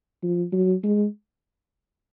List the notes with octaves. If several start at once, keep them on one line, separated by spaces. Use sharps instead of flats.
F3
F#3
G#3